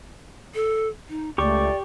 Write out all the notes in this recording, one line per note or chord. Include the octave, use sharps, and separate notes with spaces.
A4
D#4
C#2 A3 G4 D5 C#6